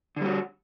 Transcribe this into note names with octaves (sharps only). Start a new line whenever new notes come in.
D3 G3 F#4